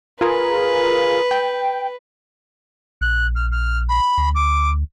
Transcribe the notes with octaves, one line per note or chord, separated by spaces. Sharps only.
F4 G#4 A#4 B4
G5
A#1 F#6
F6
F6
B5
D2
D6